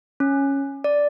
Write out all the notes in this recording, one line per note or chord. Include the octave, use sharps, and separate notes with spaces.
C#4
D5